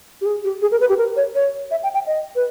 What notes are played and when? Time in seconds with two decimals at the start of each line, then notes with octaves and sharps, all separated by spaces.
0.21 G4
0.26 G#4
0.44 G4
0.62 G#4
0.71 A#4
0.81 B4
0.89 G4
0.98 A#4
1.16 C#5
1.35 C#5
1.71 E5
1.83 G5
1.94 G5
2.07 D#5
2.36 B4